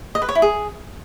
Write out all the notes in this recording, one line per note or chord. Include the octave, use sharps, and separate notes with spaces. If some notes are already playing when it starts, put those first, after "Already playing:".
D#5
B4
C#5
E4
G#4